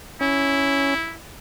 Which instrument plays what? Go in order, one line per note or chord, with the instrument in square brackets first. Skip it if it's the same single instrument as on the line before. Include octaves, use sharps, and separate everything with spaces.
[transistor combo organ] C#4 [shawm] E4